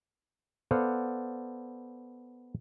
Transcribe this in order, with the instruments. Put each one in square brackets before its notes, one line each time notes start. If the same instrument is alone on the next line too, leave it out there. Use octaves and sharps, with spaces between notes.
[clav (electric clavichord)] B3 A4 C5 D5 F5 F#5